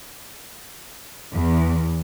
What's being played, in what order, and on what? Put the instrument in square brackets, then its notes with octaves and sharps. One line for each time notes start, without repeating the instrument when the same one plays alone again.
[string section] E2